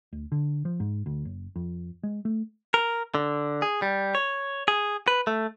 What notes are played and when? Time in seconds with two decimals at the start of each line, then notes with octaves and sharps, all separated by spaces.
0.12 D2
0.32 D3
0.65 F3
0.80 G#2
1.06 D2
1.25 F#1
1.56 F2
2.03 G#3
2.25 A3
2.74 A#4
3.15 D3
3.62 G#4
3.82 G3
4.15 C#5
4.68 G#4
5.08 B4
5.27 A3